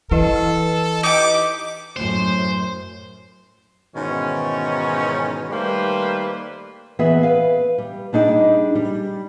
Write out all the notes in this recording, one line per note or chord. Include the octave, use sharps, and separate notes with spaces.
E3 E4 A4 B4 D#5
D#4 G4 D6
F#2 A2 C5
G#2 B2 D#3 E3 C#4
D#3 G3 A3 A#3 B4 C5
E3 B3 G#4 E5
B4 F5
G3
G3 D4 D#4 G#4
G3